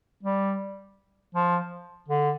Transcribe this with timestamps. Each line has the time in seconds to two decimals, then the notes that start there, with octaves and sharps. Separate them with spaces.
0.23 G3
1.35 F3
2.08 D3